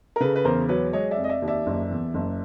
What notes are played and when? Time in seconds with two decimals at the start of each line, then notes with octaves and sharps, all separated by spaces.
0.16 A#4
0.20 C#3 A4 B4
0.35 B4
0.45 E2 A#4 C5
0.69 F#3 B4 C#5
0.93 G#3 C#5 D#5
1.11 D5 E5
1.18 F1
1.24 D#5
1.29 D5 E5
1.42 D#2
1.48 D5 E5
1.66 F#1
1.90 E2
2.14 F#1